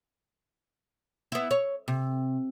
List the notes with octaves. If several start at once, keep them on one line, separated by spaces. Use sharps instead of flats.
B3 E4
C#5
C3